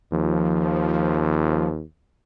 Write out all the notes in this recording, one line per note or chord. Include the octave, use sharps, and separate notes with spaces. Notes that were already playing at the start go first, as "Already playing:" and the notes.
D#2 F3